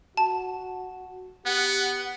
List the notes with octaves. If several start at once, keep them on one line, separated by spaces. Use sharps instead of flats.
F#4 A5
B3 G4 F#5